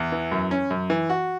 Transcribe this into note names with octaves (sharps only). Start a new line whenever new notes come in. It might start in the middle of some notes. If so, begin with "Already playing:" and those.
Already playing: E2
E3
F#2
C#4
F#2
E3
F#4